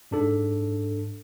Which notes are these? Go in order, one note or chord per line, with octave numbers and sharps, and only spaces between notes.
G#2 D4 A4